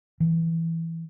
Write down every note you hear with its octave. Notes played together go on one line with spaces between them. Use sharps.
E3